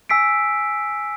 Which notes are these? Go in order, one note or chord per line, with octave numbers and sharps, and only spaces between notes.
G#5 E6 B6 C7 D7